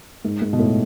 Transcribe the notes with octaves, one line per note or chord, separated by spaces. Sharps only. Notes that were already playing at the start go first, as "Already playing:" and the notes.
G#2
G#2
B2
A2